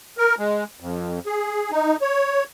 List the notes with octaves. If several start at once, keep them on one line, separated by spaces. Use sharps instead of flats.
A#4
G#3
F2
G#4
D#4
C#5